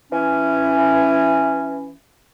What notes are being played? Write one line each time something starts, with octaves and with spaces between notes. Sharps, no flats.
E3 C#4